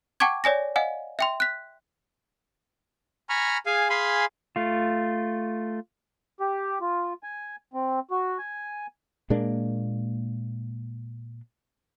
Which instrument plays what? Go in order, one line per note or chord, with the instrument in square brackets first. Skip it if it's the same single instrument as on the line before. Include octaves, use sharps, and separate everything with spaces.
[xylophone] F#5 G5 A5 C#6 D6 G#6
C#5 D5 G#5 A#6
D#5 F5 F#5 G#5
E5 G5 C6
F#6 B6
[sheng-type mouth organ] G#5 A#5 B5 C#6 F6
G#4 F5 G#5
G#4 F5 G#5 B5 C6
[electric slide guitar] A3 F4
[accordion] G4
F4
G#5
C4
F#4
G#5
[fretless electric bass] A#2 G#3 A#3 D4